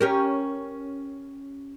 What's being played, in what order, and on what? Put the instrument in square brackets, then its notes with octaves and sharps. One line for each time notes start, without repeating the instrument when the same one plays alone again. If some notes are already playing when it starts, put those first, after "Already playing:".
[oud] C#4 G4 A#4